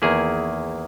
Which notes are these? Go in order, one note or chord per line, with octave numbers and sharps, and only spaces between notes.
E2 D#3 A#3 E4 G#4